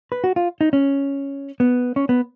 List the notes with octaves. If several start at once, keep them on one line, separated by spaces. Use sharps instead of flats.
B4
F#4
F4
D#4
C#4
B3
C#4
B3